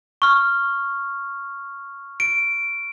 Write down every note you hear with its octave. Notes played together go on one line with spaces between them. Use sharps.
C#6 F6
D7